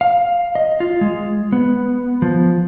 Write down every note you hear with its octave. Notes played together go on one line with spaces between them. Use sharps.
F5
D#5
F4
G#3
B3
F3